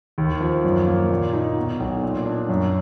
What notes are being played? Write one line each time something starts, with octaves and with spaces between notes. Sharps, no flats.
D#2
F3
F#2
A#3
A#2
D#4
B2
B1
A#2
D4
F#2